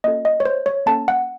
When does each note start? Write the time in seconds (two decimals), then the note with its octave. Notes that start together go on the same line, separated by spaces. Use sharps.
0.04 A#3 C#4 F4 A4 D#5
0.25 D#5
0.40 C#5
0.45 C5
0.66 C#5
0.86 A#3 C#4 A4 A5
1.08 F#5